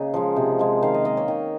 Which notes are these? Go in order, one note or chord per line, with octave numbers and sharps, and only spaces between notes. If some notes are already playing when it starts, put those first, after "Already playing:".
Already playing: C#3 A#3 D#4 G#4
F3 G#3
C3
F3 G#3
D#3 F5
D#5
A#3 D#5
C#5
D#3